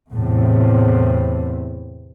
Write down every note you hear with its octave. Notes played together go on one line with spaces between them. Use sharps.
E2 A2 C3